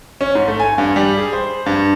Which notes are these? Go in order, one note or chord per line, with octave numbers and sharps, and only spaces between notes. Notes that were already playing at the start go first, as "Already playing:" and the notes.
C#4
G#2
A3
G#5
G2
G3
G#4
C5
G2